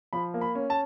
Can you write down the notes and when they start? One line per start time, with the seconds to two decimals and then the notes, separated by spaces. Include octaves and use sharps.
0.13 F3 B5
0.34 A#3
0.41 B5
0.55 C#4
0.70 A5